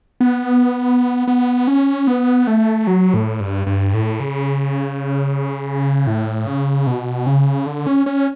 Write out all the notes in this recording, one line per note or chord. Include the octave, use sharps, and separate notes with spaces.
B3
B3
C#4
B3
A3
F#3
A2
G2
G2
A2
C#3
A2
C#3
B2
C#3
D3
C#4
C#4